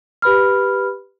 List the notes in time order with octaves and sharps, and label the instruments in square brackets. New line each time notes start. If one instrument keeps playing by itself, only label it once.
[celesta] G4 B4 B5 F6